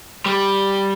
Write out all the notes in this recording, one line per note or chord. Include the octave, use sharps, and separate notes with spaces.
G3